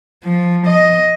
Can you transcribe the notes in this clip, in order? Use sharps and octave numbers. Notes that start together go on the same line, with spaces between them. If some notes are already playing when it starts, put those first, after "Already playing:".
F3
D#5